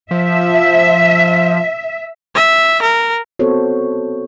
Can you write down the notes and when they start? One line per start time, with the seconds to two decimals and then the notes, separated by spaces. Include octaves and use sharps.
0.11 F3 E5
2.35 E5
2.82 A#4
3.39 B3 C4 F#4 A4 C5 C#5